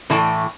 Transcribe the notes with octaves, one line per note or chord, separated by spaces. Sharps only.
A2 E3 A3 E4 A4